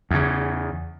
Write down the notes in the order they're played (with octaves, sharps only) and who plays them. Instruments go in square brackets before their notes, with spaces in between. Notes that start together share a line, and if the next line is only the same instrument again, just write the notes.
[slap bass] E2 C#3